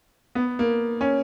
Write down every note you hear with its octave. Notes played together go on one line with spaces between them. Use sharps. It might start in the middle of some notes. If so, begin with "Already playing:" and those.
B3
A#3
C#4